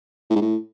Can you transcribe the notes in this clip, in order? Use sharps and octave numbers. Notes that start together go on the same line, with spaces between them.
A2
G#2
A2